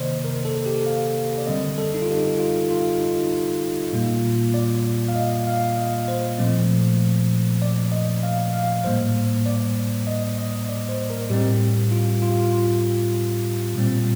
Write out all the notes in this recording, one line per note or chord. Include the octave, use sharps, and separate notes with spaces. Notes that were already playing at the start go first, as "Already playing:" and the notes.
Already playing: C3 D#3 A#3 C5 D5 D#5
A#4
A4
G4
F5
D5
D3 G3 C4 D#5
A4
D#4
F4
G4
F4
F4
D#4
A#2 G3 A#3 F4
D5
F5
D#5
F5
D#5
C5
A#2 F3 A3 C4
D5
D#5
F5
F5
A2 G3 A#3 C5
D5
D#5
D#5
D5
C5
A#4
A2 G3 C4 G4
F4
F4
G4
F4
F4
A#2 G3 C4